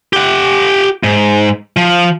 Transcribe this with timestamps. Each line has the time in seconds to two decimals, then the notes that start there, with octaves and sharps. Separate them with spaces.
0.13 G4 F#5
1.03 G#2
1.77 F3